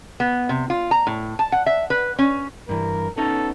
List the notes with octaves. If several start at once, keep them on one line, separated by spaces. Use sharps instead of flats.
B3
C3
F4
A#5
A2
A5
F#5
E5
B4
C#4
G2 E3 A#4
B3 C#4 D#4 A4